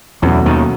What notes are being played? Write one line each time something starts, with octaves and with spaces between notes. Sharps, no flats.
E2 B2 E3 F#3 A3 C#4 F#4
D#2 D#3